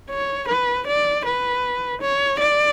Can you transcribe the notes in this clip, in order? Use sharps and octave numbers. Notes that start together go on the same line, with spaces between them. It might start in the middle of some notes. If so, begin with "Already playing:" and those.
C#5
B4
D5
B4
C#5
D5